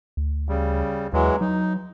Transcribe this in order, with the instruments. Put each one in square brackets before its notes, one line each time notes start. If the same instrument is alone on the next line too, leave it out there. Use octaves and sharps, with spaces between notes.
[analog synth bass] D2
[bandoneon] C#3 G3
[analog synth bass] D#2 [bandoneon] E3 F#3 G#3
[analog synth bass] F#3 [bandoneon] D#4